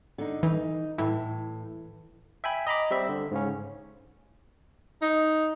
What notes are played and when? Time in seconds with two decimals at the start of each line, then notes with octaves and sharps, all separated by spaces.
0.18 D3 D#4
0.43 E3 D#4
0.98 A2 E3
2.44 E5 G5 G#5 B5
2.67 D#5 A#5 B5 D6
2.91 G3 C4 E5
3.09 D3
3.31 G#2 C#3 C#4
5.02 D#4